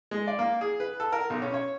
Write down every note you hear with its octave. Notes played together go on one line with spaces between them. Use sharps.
G#3
D5
A#3
G#4
B4
A4
A#4
B1
C#4
C#5